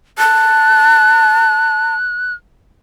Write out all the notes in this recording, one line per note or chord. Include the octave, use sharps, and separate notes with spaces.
A5 F#6